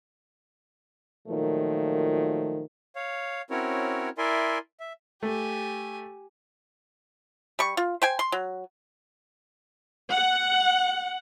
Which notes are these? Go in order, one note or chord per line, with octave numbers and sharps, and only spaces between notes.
A#2 D#3 F3 F#3 A3
C#5 F5
C4 C#4 E4 F#4 A#4 C#5
E4 A#4 D5 E5 G#5 C6
E5
A3 G4 G#5
G3 C#6
F4
C5 G5 G#5
C6
F#3
F#5